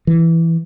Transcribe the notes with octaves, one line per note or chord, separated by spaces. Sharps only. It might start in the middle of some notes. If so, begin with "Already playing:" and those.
E3